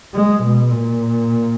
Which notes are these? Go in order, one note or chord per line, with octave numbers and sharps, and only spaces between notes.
G#3
B2
A#2